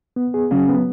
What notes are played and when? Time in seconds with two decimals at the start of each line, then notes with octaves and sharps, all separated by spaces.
0.16 B3
0.34 G#4
0.51 C#3 F#3
0.68 B3